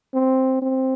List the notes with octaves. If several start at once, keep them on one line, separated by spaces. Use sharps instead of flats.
C4
C4